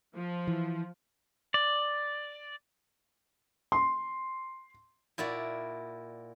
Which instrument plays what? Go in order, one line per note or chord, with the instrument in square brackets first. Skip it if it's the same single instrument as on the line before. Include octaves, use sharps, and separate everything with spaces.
[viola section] F3
[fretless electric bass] E3
[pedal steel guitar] D5
[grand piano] C6
[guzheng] A#2 E4 F#4 D5